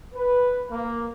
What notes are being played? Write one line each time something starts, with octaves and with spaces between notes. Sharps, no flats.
B4
A#3